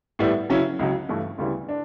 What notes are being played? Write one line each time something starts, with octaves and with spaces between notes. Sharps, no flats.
A2 G3 B3 E4
C#3 F#3 C#4 E4
C#2 C#3 F#3
G2 E3 A3 E4
D2 C#3 G3 B3 E4
D4